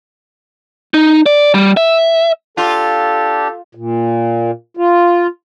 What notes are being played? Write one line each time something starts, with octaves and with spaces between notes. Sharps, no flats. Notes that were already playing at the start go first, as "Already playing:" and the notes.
D#4
D5
G3
E5
D4 F4 G4 A4
A#2
F4